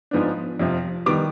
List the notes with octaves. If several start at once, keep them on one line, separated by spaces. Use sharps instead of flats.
G#2 F3 B3 D4
F2 C3 F3
D#3 G3 B3 D6